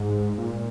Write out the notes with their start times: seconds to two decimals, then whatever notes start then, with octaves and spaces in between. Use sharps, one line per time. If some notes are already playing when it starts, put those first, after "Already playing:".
Already playing: G#2
0.38 A#2